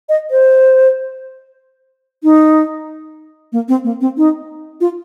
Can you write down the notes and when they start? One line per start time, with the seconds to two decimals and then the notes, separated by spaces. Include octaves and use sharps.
0.09 D#5
0.31 C5
2.24 D#4
3.52 A#3
3.68 C4
3.84 A#3
4.01 C4
4.17 D#4
4.81 F4